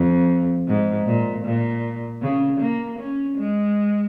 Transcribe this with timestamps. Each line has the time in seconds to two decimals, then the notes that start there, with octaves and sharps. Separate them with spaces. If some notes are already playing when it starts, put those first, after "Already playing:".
Already playing: F2
0.67 G#2
1.06 A#2
1.45 A#2
2.22 C#3
2.60 A#3
2.99 C#4
3.38 G#3